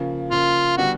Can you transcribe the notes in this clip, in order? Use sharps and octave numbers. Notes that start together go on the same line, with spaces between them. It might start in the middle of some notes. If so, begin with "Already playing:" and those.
Already playing: C#3 F3 A#3
C#3 F3 A#3 F4
D3 G3 B3 F#4